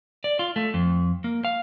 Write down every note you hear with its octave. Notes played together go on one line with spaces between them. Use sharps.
D5
F4
A3
F2
A#3
F5